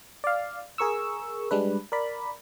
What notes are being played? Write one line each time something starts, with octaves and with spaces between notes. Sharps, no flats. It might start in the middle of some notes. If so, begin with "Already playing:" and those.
D5 F5
G#4 A#4 C#6 E6
G3 G#3 D4 B4
A#4 D5 B5